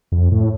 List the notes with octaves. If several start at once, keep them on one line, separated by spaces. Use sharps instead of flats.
F2
A2